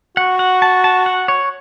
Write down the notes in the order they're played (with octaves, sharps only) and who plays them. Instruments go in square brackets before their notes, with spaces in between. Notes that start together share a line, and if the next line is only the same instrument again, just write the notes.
[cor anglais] F#4 [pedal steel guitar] F#5
[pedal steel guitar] F#5
A5
A5
F#5
C#5